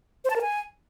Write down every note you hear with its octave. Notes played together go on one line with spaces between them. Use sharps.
C5
A5
A#4
G#5